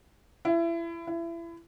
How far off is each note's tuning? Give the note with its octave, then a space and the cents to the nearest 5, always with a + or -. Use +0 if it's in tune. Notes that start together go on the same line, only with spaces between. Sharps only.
E4 +30
E4 +30